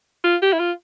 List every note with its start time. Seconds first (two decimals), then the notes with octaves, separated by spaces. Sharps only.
0.24 F4
0.42 G4
0.53 E4
0.59 F4